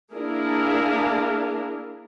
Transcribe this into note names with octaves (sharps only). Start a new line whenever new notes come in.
A#3 D4 E4 G#4 A#4